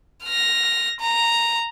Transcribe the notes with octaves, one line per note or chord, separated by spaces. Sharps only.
F6 A#6
A#5